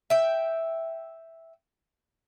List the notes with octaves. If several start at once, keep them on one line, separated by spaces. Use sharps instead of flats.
E5 G5